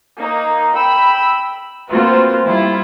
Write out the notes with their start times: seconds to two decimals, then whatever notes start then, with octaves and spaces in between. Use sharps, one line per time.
0.17 A#3 D#4
0.75 G5 B5 E6
1.91 A#3 C4 F4 F#4 B4 C5
2.47 G3 E4 F4